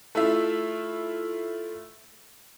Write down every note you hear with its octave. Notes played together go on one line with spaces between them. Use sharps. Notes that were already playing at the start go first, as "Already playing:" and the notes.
A3 E4 F4 E5